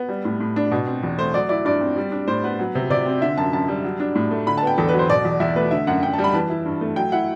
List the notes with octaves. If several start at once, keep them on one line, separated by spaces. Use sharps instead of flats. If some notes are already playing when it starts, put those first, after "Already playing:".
Already playing: B3
G3
A2
A2
D4
B2
C4
E2
A3 C5
F#3 D5
E4 D5
G2 D5
C4
G3
D4
A2 C5
B3 B4
F#3
C3
C3 D5
C4
D3 E5
F#2 A5
F#2 A5
G3
F#3
D4
A2
A3
D3 B5
A5
B3 G5
E2 A4
B4
F#3
C5
B2 D5
E2
E2 E5
A3 B4
D3 E5
F#2 F#5
F#2 G5
A5
G3
B5
E3 A5
E4
G2
A3
F#3 G5
E4 F#5